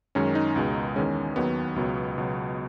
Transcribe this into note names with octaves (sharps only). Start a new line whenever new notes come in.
F#2 D#3 G#3 C#4
D#4
C#2 B2 G#3
E2 D#3 G#3 C#4
D#2 D#3 F#3 B3
C#2 B2 F#3
C#2 B2 F#3